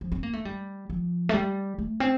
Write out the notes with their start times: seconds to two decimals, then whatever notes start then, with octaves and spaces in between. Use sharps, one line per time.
0.01 F3
0.12 C4
0.23 A#3
0.33 A3
0.45 G3
0.90 F3
1.29 A3
1.34 G3
1.79 A3
2.00 C4